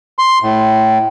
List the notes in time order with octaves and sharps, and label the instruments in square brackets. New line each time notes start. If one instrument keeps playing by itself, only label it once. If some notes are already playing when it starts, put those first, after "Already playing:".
[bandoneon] C6
A2